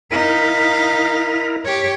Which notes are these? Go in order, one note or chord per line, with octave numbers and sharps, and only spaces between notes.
D#4 E4 A#4 F5 B6
G4 C#5